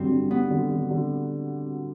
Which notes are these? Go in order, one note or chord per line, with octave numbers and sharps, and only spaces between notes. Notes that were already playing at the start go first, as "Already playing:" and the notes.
Already playing: G2 D3 F#3 C4
G2
G2 B3
D3
D3
D3